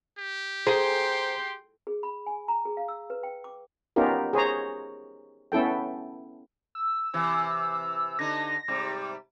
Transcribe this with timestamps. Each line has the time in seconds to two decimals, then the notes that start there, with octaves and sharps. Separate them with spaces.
0.18 G4
0.67 G#4 C5 G5 A#5 C6
1.87 G#4
2.03 B5
2.26 G#5
2.48 A#5
2.65 G#4
2.77 F5
2.88 E6
3.10 B4
3.23 G5
3.44 D6
3.96 B3 C#4 D#4 F4 G4 A#4
4.33 G#4 C5 C#5 A#5
5.52 B3 C#4 E4 A4 G5
6.75 E6
7.14 C3 E3
8.19 D3 D#4 A#6
8.68 G#2 C3 G3